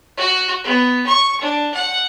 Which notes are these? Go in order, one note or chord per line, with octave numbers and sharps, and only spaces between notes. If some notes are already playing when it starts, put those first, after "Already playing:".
F#4
B3
C#6
D4
F#5